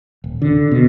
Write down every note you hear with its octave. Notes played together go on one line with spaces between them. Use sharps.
D#1
D3
B2